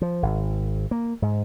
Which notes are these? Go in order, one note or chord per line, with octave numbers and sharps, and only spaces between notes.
F3
G#1
A#3
G#2